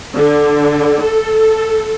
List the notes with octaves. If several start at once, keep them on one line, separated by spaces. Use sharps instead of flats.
D3
A4